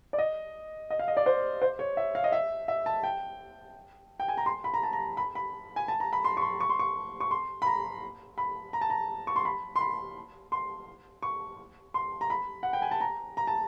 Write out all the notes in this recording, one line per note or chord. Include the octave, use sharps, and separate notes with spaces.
D5
D#5
D#5
F5
D#5
D5
C5
C5
C#5
E5
F5
D#5
E5
E5
A5
G5
G5
G#5
A#5
C6
B5
A#5
A5
A#5
B5
B5
G#5
A5
A#5
B5
C6
C#6
C6
C#6
C6
C#6
C#6
C6
B5
A#5
B5
A#5
A5
A#5
C#6
C6
B5
C6
B5
C6
C#6
C6
A#5
B5
F#5
G5
G#5
A5
A#5
A#5
A5